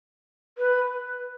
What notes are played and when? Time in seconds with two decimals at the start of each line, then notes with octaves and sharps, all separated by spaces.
0.58 B4